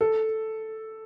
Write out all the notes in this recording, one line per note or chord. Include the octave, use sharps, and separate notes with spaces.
A4